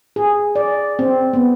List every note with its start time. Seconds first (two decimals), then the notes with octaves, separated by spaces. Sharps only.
0.16 G#4
0.56 D5
0.99 C4
1.33 B3